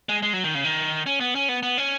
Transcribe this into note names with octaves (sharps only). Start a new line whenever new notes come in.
G#3
G#3
F#3
D#3
C#3
D#3
C#4
B3
C#4
B3
B3
C#4